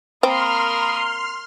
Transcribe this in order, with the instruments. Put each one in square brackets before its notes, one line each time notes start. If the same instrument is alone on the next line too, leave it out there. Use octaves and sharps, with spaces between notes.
[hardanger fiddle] A#3 A#4 [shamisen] C4 [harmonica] B5 D#6 [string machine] C6 F6